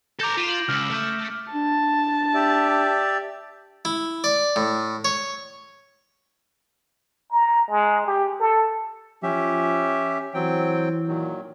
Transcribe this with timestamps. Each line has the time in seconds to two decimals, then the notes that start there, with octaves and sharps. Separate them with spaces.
0.19 A4 A#5 D6 G6 A#6
0.37 F4 B6 D7 E7
0.49 F#7
0.69 C#2 E6 F6
0.91 A3
1.53 D4 A5
2.34 G4 D5 E5
3.85 E4
4.24 D5
4.56 A2
5.05 C#5
7.31 A#5
7.70 G#3
8.07 G4
8.40 A4
9.23 F3 C#4 G4 E5
10.34 E3 F#3 C4 G5
11.08 A#2 D#3 F#3